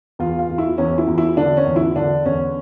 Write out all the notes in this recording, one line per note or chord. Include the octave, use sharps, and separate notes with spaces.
E2 F4
F4
E2
E4
E2 C#4
E4
E2
E4
D3 D4
C#4
E2
E4
D3 D4
E2 C#4